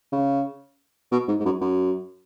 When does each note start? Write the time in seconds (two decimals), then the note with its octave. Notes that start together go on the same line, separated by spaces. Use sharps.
0.12 C#3
1.12 B2
1.28 G#2
1.40 G#2
1.45 F#2
1.61 F#2